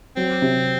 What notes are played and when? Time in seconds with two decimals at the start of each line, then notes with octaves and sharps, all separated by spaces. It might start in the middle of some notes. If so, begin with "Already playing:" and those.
0.17 F#3 C4
0.42 C3